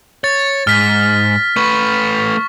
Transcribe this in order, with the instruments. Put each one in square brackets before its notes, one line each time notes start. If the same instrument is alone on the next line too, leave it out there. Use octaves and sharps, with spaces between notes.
[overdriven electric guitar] C#5 [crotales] A6
[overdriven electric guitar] G#2 [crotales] F6 B6
[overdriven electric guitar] A3 B4 [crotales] C#6